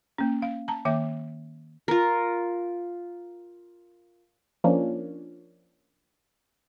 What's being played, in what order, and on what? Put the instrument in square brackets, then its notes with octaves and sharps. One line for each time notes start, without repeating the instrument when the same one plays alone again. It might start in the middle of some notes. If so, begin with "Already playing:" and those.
[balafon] A#3 C#4
F5
A5 A#5
D#3 A#3 E5 D6
[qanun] F4 A#4
[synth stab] F3 A#3 C#4 D4